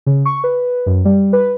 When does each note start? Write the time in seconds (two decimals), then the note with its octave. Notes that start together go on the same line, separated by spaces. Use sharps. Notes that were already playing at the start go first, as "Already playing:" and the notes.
0.06 C#3
0.25 C#6
0.44 B4
0.86 F#2
1.05 G3
1.33 B4